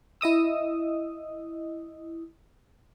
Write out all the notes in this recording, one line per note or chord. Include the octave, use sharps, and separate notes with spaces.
E4 D#5 D#6 E6